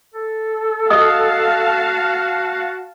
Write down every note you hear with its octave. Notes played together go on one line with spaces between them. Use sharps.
A4
F#4 D#5 F5 A5 D#6